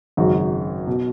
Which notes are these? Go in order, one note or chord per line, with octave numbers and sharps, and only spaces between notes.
G#1 F#2 C#3 F#4
B2